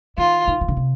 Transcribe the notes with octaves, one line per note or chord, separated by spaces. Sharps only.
D#3 F4
D#3
D#3
D3
C3